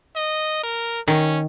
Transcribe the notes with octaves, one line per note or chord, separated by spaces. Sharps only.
D#5
A#4
D#3 C#4